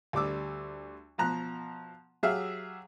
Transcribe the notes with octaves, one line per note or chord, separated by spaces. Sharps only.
D2 G3 D6 E6
B2 F3 A#5 F#6
F#3 G4 G#4 E5 F5 F6